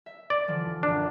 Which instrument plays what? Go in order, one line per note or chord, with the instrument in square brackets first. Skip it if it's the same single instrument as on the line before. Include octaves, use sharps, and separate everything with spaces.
[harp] E5
[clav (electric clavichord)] D5
[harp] D3 E3 F3
[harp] F#2 A#2 [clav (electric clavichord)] D4